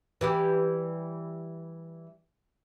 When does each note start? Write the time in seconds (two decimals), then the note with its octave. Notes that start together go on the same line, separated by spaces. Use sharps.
0.21 E3 G3 G4